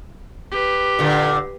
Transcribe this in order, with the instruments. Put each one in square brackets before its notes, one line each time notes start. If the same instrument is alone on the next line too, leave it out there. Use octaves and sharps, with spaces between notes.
[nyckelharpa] G4 B4
[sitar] A#2 D3